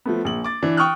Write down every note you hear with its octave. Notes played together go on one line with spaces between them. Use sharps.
F3 A3 B3
A#1 F#7
D6 A6
E3 D4
G5 C#6 D#6 F6 F#6